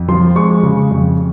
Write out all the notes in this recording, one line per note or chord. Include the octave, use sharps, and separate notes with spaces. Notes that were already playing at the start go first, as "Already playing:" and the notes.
Already playing: F2
F3 C6
G#3 C#6
C#3
F2